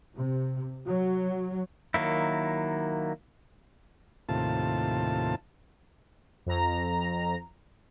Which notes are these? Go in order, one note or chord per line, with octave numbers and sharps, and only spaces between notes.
C3
F#3
D#3 F#3 A#3 E4
D#2 A2 C3 F4 A5
F2 A#5